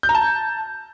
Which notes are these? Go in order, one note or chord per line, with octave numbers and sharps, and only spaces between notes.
G6
A#5
A5